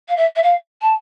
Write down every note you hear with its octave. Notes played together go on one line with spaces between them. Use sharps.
F5
E5
E5
F5
A5